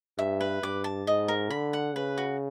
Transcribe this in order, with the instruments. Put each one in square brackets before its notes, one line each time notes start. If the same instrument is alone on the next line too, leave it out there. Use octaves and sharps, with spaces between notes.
[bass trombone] G2 [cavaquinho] E5
[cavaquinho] B4
[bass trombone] G2 [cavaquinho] D6
[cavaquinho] A5
[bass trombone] G#2 [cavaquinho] D#5
[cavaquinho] A#4
[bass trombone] D3 [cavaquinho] B5
[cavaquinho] F#5
[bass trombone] C#3 [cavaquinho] B4
[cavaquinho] F#4